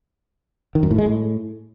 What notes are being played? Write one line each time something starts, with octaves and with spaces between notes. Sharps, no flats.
D#3
F#2
A2
G#3
A2